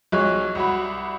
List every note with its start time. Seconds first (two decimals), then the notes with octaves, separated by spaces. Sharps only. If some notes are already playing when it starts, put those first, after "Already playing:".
0.12 B1 F3 G#3 C#5 F#6
0.55 C2 F#4 B5